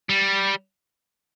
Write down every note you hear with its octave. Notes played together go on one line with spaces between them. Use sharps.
G3